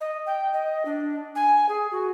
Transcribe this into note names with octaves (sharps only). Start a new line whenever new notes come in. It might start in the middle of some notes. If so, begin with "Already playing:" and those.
D#5
G5
D#5
D4
G#5
G#4
F#4